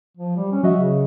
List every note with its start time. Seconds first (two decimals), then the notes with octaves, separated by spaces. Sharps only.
0.17 F3
0.36 G3
0.52 C#4
0.63 F#3 F#4 D#5 E5
0.77 C#3